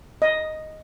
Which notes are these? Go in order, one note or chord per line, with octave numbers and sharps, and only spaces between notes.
D#5